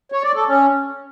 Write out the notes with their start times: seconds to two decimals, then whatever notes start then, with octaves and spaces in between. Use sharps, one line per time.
0.12 C#5
0.23 D5
0.35 A4
0.46 C#4